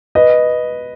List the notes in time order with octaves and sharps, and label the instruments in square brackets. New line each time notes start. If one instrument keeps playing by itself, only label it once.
[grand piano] B4 D#5